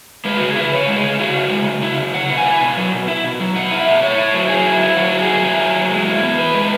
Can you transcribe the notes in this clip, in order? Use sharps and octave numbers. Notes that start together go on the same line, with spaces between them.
G#3 B4
C#3 F#4
G#4
E4 B4
C#3 C#5
G#3
G#4
C#3
E4 F#4
C#3
G#3
C#3
E4
C#3
F#3 F#5
B2
G#5
E4
B2
F#3
B2
E4
B2
F#3
B2 F#5
E4
E5
B2
E4 C#5
E4
F#3
F#3 G#4
E4
E4
F#3 F#4
F#3
G#4
E4
E4 G#4
F#3
F#3
G#3
E4
B3
E3 B4
G#3
B4